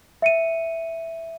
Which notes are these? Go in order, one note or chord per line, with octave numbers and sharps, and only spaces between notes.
E5 C#7 D#7